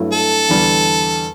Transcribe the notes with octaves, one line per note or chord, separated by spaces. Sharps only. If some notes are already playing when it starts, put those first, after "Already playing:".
Already playing: G2 F#3 A3 E4
A4
E2 D3 G3